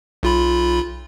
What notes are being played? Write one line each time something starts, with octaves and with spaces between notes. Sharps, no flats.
B1 F4 B5